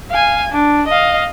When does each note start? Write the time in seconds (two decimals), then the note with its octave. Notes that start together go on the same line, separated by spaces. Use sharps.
0.11 F5 G#5
0.52 D4
0.88 D#5 F5